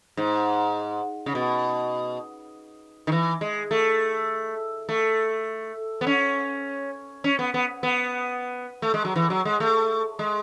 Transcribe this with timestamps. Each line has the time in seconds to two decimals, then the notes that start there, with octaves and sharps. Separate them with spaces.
0.17 G#2
1.26 C#3
1.35 B2
3.07 D#3
3.12 E3
3.41 G#3
3.71 A3
4.89 A3
6.01 B3
6.07 C#4
7.24 C#4
7.39 B3
7.54 B3
7.83 B3
8.82 A3
8.94 G#3
9.05 F#3
9.16 E3
9.30 F#3
9.45 G#3
9.60 A3
10.19 G#3